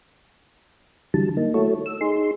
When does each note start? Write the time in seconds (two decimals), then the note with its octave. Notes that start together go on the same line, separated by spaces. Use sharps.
1.14 D3 E3 F#3 G3 A5
1.37 A#3 D#4
1.54 A3 E4 F#4 A4 C#5
1.86 E6
2.01 D#4 G#4 C6